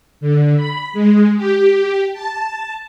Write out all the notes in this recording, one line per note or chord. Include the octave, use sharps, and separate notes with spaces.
D3
B5
G#3
G4
A5